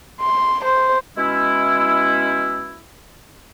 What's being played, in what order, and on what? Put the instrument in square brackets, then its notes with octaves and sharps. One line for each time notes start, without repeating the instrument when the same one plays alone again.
[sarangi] C6
C5
[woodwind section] B2 G#3 C#4 E4